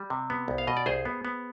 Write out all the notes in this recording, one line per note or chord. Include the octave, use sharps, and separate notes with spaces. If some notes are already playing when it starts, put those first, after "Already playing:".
Already playing: G3
C3
B3
C2
F5
B2 D#5
D5
C2 G#4 C5
B3
B3